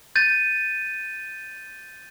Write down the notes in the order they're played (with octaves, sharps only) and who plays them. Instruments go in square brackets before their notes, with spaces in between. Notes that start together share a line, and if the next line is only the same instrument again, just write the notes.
[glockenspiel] G6 A6 D#7